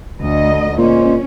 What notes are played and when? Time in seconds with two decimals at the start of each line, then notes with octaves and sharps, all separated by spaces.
0.19 D2 D3 D#5
0.78 A#2 G#3 A#3 C#4 C5